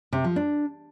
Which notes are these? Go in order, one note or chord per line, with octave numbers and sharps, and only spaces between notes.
C3
F3
D4